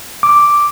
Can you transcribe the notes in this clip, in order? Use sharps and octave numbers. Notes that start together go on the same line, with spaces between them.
D6